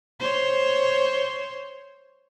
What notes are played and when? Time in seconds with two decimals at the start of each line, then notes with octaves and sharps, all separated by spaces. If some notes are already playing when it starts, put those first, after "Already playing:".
0.20 C5 C#5